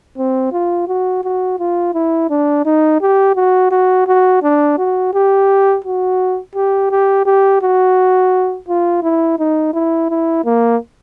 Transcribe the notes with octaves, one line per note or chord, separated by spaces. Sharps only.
C4
F4
F#4
F#4
F4
E4
D4
D#4
G4
F#4
F#4
F#4
D4
F#4
G4
F#4
G4
G4
G4
F#4
F4
E4
D#4
E4
E4
A#3